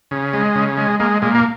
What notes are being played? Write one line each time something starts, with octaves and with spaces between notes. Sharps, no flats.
C#3
G#3
C#3
G#3
G#3 A#3
A#2 G#3
A#3